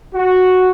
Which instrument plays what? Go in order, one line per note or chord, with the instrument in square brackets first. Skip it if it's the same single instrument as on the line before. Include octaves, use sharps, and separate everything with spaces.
[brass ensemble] F#4